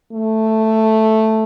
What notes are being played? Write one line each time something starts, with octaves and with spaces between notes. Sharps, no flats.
A3